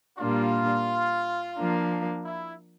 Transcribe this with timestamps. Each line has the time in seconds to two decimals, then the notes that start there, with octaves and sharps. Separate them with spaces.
0.19 A#2 G3 A#3 D4 F4
1.57 F3 A#3 D4
2.25 E4